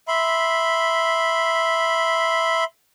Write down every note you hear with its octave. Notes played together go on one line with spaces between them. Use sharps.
E5 B5 C6